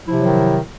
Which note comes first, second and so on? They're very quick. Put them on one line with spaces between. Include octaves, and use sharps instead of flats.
F3 E4 C3 F#3 D#3